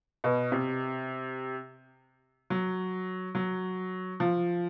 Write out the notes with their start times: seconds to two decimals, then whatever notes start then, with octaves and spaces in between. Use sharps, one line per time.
0.24 B2
0.52 C3
2.50 F#3
3.35 F#3
4.20 F3